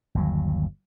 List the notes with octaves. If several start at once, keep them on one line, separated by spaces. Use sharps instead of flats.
G1 D#2 F#3